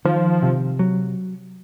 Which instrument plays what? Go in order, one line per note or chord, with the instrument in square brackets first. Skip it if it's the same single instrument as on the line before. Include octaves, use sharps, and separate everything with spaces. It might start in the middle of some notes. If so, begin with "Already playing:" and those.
[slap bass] D#3 [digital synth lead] F3
[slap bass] C3
F#3